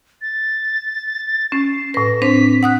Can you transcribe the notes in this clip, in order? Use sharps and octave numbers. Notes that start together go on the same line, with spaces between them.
A6
C#4 C7
A2 B4 A#6
C4 D4 C5 B6
F#5 D#6 F#6